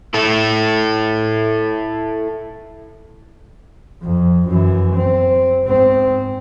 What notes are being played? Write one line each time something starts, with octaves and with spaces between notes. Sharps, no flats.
E4 A4
F2
F#2 E3
C4
G#2 C4